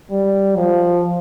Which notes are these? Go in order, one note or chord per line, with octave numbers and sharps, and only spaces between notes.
G3
F3